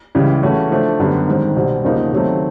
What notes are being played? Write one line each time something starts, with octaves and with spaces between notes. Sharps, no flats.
C#2 C#3 E3 G3
C#3 E3 A3 C#4 F#4
F3 A3 D4
F#2 D3 G3 B3
G#2 D#3 G3 C4
C2 B2 G3 C4
E2 C#3 F3 A#3 D#4
C3 D#3 F#3 A3 C4